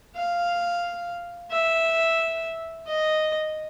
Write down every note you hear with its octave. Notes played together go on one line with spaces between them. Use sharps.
F5
E5
D#5